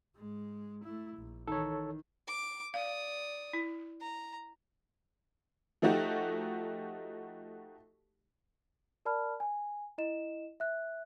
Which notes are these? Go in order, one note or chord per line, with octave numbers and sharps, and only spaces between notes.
G#2 G#3
A3 E4
A#1
D#3 E3 A4 C#5
D6
D5 F5 D#6
E4
A#5
F3 A3 D#4 F#4 G4
A#4 D5 A5 B5 F6
G#5
E4 D#5 E7
E5 F#6